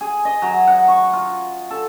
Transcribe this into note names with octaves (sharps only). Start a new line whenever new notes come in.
G#4
D#5
F#3
F#5
C#6
F4
A4